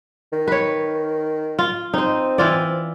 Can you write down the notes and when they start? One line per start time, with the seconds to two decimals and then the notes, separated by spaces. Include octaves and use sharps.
0.33 D#3
0.48 B4 C#5
1.59 F4
1.94 C4 D#4 C5
2.38 E3 F4 D5